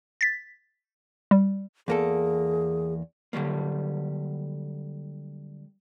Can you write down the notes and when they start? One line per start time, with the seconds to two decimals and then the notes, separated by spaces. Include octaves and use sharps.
0.21 A6 B6
1.31 G3
1.88 E2 A#3 G#4 A4
3.33 D3 F#3 G3 A#3